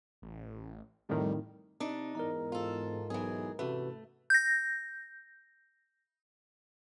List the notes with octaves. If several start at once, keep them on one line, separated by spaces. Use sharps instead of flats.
A1
F2 A2 D#3 G3
C3 D4 D#4
E2 G#2 A#4 D#5 A#5
F4 A4
B1 E3 G#4
A1 C3 A3 F#4 B4
G6 A#6